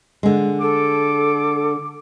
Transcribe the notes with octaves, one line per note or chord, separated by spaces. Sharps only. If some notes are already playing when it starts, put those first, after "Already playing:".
D3 G#3
A4 D6